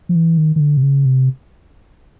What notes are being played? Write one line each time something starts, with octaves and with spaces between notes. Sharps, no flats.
F3
E3
D#3
D#3
D3
C3
C#3
C3